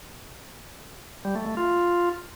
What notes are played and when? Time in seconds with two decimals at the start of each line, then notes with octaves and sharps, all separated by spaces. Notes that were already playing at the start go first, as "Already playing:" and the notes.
1.25 G3
1.36 A3
1.46 A3
1.57 F4